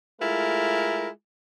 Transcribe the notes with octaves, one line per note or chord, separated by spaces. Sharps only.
G#3 A3 E4 F4 A#4